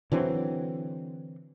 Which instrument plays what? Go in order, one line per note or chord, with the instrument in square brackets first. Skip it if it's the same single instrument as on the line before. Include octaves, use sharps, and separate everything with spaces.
[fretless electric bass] D3 E3 F#3 C4